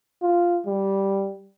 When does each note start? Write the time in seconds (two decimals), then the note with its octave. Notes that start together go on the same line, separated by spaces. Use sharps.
0.22 F4
0.66 G3